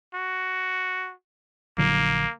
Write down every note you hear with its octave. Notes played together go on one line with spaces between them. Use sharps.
F#4
A#1 D3 F#3 A#3